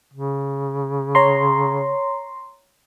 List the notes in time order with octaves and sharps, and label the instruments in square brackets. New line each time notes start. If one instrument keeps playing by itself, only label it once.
[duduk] C#3
[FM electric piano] C#5 A#5 C6